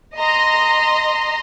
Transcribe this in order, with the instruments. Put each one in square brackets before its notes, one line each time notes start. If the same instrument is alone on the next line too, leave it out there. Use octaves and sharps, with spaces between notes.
[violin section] D#5 A#5 C6